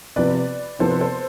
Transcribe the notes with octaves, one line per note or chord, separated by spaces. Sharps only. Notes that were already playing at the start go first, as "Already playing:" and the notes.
C3 F3 B3 B4 D5
C3 F3 B3 A4 C5
B4
A4 C5